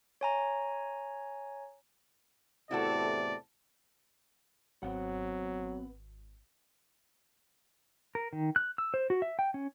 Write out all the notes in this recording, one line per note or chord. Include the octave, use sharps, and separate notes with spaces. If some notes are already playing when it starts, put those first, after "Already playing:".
C#5 G#5 A#5
E2 A2 C3 E4 F#4 A4 D5
G#1 F#3 B3 C4 F#5
A#4
D#3
F#6
E6
C5
F#4
E5
G5
C#4